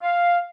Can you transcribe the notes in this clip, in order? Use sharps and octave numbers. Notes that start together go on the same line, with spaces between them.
F5